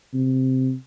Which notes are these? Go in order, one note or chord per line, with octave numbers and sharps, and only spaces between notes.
C3